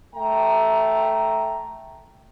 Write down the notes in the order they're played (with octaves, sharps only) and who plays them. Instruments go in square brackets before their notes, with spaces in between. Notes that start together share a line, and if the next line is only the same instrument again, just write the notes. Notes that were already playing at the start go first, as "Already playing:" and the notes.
[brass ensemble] A3 G5 A#5